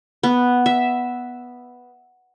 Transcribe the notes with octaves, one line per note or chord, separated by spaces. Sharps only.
B3
E5